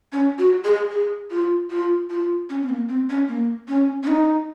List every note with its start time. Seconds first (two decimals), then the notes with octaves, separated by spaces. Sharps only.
0.13 C#4
0.39 F#4
0.64 G#4
0.91 G#4
1.31 F4
1.70 F4
2.10 F4
2.50 C#4
2.62 C4
2.69 A#3
2.89 C4
3.10 C#4
3.29 A#3
3.68 C#4
4.03 C#4
4.07 D#4